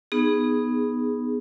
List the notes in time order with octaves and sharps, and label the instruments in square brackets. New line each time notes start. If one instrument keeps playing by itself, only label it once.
[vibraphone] B3 D#4 G#4